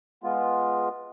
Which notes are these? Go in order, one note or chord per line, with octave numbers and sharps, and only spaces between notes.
G#3 B3 F4